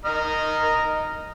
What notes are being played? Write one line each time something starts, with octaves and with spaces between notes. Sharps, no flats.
D#5 A#5 F6